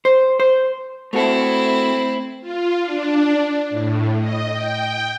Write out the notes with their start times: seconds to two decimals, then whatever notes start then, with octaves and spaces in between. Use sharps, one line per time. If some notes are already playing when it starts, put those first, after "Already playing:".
0.05 C5
0.40 C5
1.13 A3 C4 E4 F#4 A4
2.41 F4
2.83 D4
3.70 A2
4.20 D#5
4.52 G5